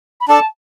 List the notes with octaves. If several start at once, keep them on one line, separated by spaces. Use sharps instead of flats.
B5
D4 A4 D5 A5